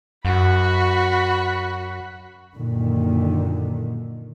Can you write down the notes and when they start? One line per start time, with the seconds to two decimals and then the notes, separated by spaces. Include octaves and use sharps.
0.25 F#2 F#4 B5
2.55 F#2 A#2 D3 D#3